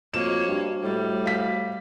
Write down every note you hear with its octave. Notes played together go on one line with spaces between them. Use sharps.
F2 A#3 F#4 C5 C#5 D#5 E7
G2
A2 G3
F5 B6